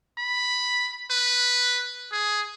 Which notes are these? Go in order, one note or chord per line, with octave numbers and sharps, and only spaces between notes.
B5
B4
G#4